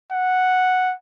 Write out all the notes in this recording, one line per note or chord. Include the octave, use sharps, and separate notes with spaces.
F#5